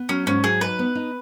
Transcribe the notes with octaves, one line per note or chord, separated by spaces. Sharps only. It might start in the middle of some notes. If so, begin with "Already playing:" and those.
Already playing: B3
F#3 C#4
G#2 C#4
F#3 G#4
D#4 B4
B3
D#4